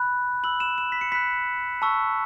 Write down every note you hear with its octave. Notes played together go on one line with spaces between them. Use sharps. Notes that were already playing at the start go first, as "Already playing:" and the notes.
Already playing: B5 F#6
B5 E6 F#7
E7
E7
B6
C#7
B5 F#6 B6
A5 C#6 E6